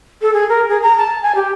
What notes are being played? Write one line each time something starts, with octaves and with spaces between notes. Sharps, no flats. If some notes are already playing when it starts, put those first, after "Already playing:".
A4
G#4
A#4
G#4
A#5
A5
G#5
G4